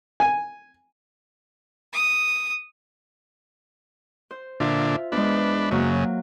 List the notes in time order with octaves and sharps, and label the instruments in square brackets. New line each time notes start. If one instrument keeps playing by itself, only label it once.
[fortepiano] G#5
[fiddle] D#6
[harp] C5
[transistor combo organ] A#2 D3 D4 [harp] F4 E5
[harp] E2 G#3 [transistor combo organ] D4 B4
[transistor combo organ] F#2 C#3 [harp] F#3 A#3